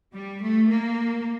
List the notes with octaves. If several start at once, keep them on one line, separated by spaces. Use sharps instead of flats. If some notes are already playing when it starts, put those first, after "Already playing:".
G3
A3
A#3